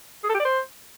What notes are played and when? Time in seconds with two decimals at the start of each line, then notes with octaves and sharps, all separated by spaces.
0.24 G#4
0.29 A4
0.34 G4
0.40 D5
0.45 C5